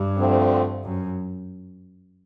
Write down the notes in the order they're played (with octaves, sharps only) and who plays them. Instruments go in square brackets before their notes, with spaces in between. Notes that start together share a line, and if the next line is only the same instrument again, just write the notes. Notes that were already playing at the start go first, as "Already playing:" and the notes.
Already playing: [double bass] G2
[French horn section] D2 D3 F3 A3 C4
[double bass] F#2